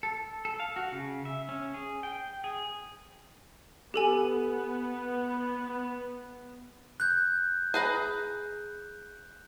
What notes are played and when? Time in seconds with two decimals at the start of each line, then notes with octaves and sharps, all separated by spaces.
0.03 A4
0.45 A4
0.60 F5
0.76 F#4
0.92 C#3
1.25 E5
1.49 C#4
1.74 G#4
2.03 G5
2.44 G#4
3.94 B3 G4 A4 G#5
7.00 F#6 G6
7.74 G#4 B4 A#5